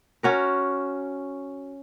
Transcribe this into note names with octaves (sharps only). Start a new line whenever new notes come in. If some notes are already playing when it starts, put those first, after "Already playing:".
C#4 F#4 A#4